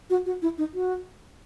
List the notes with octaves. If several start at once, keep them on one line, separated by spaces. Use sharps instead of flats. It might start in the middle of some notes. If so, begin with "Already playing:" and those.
F#4
F#4
E4
D#4
F#4